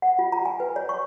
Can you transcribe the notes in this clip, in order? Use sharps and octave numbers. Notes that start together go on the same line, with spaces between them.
F#5
F4
A#5
G#5
B4
C#5
C#6